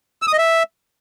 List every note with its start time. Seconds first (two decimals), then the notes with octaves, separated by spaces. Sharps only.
0.22 E6
0.27 D#6
0.33 D#5
0.38 E5